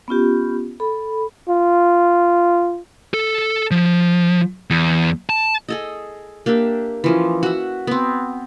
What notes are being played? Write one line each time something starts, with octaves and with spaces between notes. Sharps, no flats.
B3 C#4 F4 G4
A4 B5
F4
A4
F3
E2
A5
G#4 A4 D#5
A#3 D4 G4 E5
E3 F3 C#4
F#4 E5
B3 C4